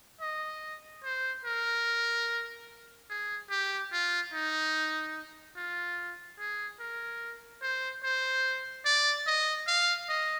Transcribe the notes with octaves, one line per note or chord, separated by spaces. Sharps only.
D#5
C5
A#4
G#4
G4
F4
D#4
F4
G#4
A#4
C5
C5
D5
D#5
F5
D#5